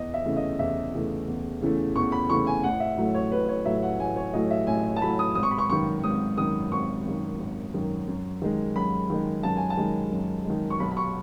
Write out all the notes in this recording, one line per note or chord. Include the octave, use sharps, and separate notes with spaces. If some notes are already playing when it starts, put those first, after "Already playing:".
Already playing: E2 D#5
E5
C#3 E3 A3
D#5
E2 E5
C#3 E3 A3
E2
C#3 E3 A3
E2 C#6
B5
C#3 E3 A3 C#6
G#5
A1 F#5
E5
A2 F#3 A3
C#5
A1 B4
C#5
A2 F#3 A3 E5
F#5
A1 G#5
C#5
A2 F#3 A3 D#5
E5
A1 G#5
A5
A2 F#3 A3 B5
D#6
G#1 D#6
C#6
B5
C#6
F#2 D#3 C#6
G#1 D#6
F#2 D#3 D#6
G#1 C#6
F#2 D#3
G#1
F#2 D#3
F#2
D#3 G#3
F#2 B5
D#3 G#3
F#2 A5
G#5
A5
D#3 G#3
F#2
D#3 G#3
C#6
B1 B5
B5
C#6